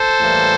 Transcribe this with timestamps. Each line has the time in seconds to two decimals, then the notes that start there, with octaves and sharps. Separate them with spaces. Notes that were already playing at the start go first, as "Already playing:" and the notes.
Already playing: A4 C5
0.20 A2 E3 G3 A#3